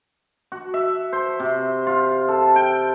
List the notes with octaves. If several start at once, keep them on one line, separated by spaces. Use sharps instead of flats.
F#4
E5
C5
C3
F4
A4
G5